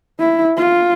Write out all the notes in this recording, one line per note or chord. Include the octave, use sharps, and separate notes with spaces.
E4
F4